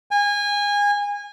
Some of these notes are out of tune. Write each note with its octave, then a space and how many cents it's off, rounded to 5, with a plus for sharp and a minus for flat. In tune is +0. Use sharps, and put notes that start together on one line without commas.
G#5 -25